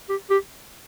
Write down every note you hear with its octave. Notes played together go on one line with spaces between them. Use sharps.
G4
G4